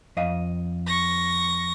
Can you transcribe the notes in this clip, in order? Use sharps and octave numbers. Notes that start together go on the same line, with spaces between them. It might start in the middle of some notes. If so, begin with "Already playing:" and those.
F2 D#5 F5
C#6 A#6